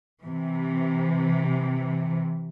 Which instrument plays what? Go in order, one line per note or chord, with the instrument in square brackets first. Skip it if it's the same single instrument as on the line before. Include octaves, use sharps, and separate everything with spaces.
[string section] C3 E3